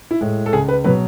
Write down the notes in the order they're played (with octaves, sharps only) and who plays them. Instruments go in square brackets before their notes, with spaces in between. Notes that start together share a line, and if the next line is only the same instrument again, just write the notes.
[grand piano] E4
A2 G#3
A4
C#2 G#4
B4
B2 F#3 B4